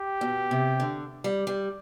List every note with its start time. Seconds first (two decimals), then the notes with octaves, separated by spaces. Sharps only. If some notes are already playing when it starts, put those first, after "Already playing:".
Already playing: G4
0.21 B2
0.51 C3
0.80 D3
1.24 G3
1.47 G3